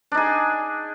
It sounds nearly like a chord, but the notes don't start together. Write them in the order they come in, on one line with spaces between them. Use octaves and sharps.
D4 D#4 G#4